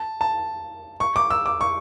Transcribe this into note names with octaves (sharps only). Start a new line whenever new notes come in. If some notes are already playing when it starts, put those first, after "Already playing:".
Already playing: A5
A5
C#6
D6
E6
D6
C#6